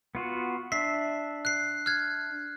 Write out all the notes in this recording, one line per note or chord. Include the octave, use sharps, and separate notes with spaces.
B3 F4 F#4
D4 E5 B6 C7
F#6 C7
F6 F#6 G#6